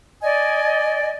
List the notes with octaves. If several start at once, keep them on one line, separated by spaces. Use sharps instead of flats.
D5 D#5 G#5